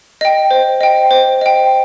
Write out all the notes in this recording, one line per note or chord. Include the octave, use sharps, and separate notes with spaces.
D#5 G5
C5
D#5 G5
C5
D#5 G5